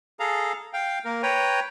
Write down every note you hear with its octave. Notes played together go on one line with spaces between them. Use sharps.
G#4 A4 F5 A#5
F5 G5
A#3 A#4
B4 C#5 G5 A#5